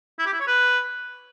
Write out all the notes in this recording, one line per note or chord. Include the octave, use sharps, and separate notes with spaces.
E4
G4
E4
C#5
B4